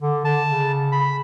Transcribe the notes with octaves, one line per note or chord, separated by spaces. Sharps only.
D3
D3 A5
C#3
B5